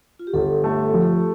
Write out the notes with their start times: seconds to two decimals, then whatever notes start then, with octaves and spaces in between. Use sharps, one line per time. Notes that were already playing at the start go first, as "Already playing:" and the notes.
0.19 F4
0.27 G4
0.34 G1 A4
0.64 A3
0.94 F3